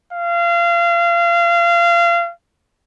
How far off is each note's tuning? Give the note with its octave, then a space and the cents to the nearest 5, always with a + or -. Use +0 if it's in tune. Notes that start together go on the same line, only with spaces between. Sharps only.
F5 -30